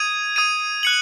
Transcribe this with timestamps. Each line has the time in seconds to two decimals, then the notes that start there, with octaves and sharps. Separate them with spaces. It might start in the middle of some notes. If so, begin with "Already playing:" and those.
Already playing: D#6 G#6 D#7
0.36 D#6 G#6 D#7
0.83 F#6 C#7 F#7